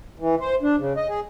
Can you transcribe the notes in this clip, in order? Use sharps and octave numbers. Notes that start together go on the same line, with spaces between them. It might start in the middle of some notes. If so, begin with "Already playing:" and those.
E3
C5
D4
C#3
D#5
G#4